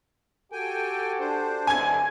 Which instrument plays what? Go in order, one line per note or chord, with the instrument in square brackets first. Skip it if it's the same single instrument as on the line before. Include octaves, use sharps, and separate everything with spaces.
[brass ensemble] F#4 G4 A4 [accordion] G5 G#5
[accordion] D4 C5
[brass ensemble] B1 E2 D3 [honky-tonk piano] G#5 G#6